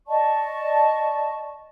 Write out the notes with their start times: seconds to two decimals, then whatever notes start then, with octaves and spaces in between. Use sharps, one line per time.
0.08 D5 D#5 A5 C#6